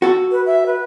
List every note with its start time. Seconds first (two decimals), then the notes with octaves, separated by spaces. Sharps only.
0.02 F#4 A4
0.31 B4
0.46 E5
0.66 B4